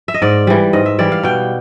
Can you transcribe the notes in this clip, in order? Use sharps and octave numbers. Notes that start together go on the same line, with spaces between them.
E5
D#5
G#2 D5
E3 G3
G#2 D#5
E5
E3 G3 D5
F5
B2 G5